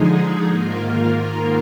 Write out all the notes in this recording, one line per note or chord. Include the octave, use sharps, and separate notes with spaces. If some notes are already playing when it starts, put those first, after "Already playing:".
Already playing: D3 F3 G#3 D#4 G#4
G#2 D#3 A#3 F4 A#4